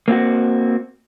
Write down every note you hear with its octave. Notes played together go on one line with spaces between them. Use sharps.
A#3 C4 F4 F#4